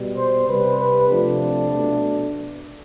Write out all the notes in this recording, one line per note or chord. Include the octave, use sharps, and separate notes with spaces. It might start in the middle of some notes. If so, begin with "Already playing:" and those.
Already playing: B2 G3
C5
C3 G3 B4
C3 F3 A3 D4
B2 A3